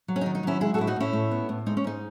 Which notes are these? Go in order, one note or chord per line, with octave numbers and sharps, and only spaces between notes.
F#3
C#4
D#4
D#3
D#4
F#3 C#4 E4
G#3 E4 G#4
F#4 A4
A2 E4
D#4 F#4
A2 C#4 E4
A2
B3
A2
G#3 D#4
C#4
G#2 D#4